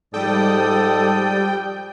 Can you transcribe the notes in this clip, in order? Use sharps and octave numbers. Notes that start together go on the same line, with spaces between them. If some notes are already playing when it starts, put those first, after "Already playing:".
G#2 F3 G3 A4 D5 G5 D#6